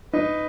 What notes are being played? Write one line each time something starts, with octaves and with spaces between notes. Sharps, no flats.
D#4 B4